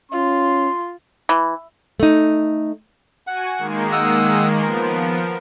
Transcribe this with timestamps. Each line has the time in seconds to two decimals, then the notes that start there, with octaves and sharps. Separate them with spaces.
0.12 C#4 F4 C6
1.29 E3
2.00 A3 D#4
3.27 F#4 F#5 G#5 C#7
3.58 D#3 G#3 A#3
3.92 F#5 D#6 E6
4.62 F3 B3 A#4